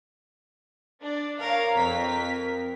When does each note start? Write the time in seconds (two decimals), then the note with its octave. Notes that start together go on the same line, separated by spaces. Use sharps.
1.01 D4 D5
1.40 A#4 C#5 F5 A#5
1.76 F2 A#4 B6